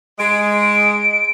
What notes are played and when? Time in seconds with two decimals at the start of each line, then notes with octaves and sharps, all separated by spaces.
0.19 G#3 D7